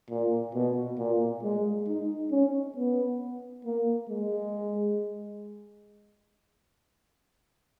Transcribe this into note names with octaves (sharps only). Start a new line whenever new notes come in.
A#2
B2
A#2
G#3
D#4
C#4
B3
A#3
G#3